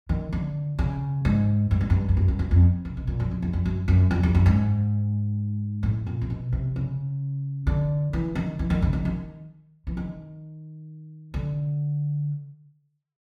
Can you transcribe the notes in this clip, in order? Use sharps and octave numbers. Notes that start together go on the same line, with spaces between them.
D#3
D3
C#3
G#2
G2
G#2
G2
G2
F#2
G2
F#2
F2
C3
B2
A#2
F#2
F2
E2
F2
F#2
F#2
F2
E2
F#2
G#2
A2
A#2
C3
B2
C3
C#3
D3
E3
D#3
E3
D#3
C#3
D#3
D#3
E3
D#3
D3